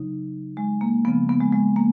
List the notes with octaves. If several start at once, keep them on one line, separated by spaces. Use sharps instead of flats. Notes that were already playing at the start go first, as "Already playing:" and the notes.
Already playing: C#3 F#3 D#4
G#3
A#3
C#3 F3 B3
B3
G#3
G#3
A#3